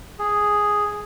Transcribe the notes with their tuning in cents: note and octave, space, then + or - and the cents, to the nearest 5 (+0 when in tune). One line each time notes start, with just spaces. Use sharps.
G#4 +0